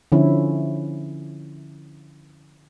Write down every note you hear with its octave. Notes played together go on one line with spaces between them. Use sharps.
D3 F3 C#4 E4